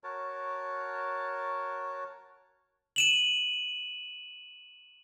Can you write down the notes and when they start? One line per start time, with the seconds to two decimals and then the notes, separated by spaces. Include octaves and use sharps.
0.04 F#4 A#4 C#5 A5
2.96 D#7 E7 F#7